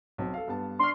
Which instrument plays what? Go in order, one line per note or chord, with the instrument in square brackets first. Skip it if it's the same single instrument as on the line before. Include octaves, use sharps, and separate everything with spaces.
[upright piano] B1 C4
A4 F5
G2 B3 A5
[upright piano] D4 C#6 F6 [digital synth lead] C6